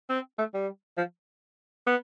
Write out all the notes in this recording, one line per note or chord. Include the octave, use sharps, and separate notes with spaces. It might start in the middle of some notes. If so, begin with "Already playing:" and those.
C4
A3
G3
F3
B3